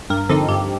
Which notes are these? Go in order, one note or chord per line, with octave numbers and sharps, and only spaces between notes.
G2 A#4
D3 F3 C4 D#4 A4
G2 G4